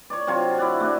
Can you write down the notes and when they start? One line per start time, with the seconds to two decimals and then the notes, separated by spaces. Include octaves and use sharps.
0.10 C#5 D5
0.27 C3 F#3 F4 C#5
0.58 E4 D5 F#5
0.80 A3 D4 F#4